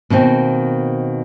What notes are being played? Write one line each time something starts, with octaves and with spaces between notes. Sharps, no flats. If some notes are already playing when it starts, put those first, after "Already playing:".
B2 D#3 A#3 C4